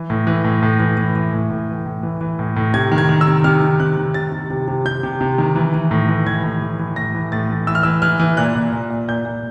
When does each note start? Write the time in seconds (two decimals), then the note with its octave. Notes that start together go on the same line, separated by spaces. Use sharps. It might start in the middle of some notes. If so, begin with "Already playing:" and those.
Already playing: E3
0.10 A2
0.27 E3
0.44 A2
0.62 A2
0.80 E3
0.97 E3
1.15 E3
1.33 A2
1.50 A2
1.69 E3
1.86 A2
2.03 E3
2.21 E3
2.39 A2
2.56 A2
2.74 C3 G#6
2.92 D#3
2.98 G#6
3.09 D#3
3.21 E6
3.27 C3
3.44 C3 F6
3.62 D#3
3.80 C3 F#6
3.97 D#3
4.14 C3 A6
4.32 C3
4.50 C3
4.68 C3
4.85 C3 G6
5.03 C3
5.21 C3
5.38 D#3
5.56 E3
5.74 E3
5.91 A2
6.09 E3
6.26 E3 G#6
6.43 A2
6.62 E3
6.79 E3
6.96 A2 A#6
7.15 E3
7.32 A2 A6
7.49 E3
7.67 E3 E6
7.75 F6
7.83 E3 E6
8.02 E3 F6
8.19 E3
8.37 A#2 F#6
8.55 A#2
8.72 A#2
8.90 A#2
9.08 A#2 G6
9.25 A#2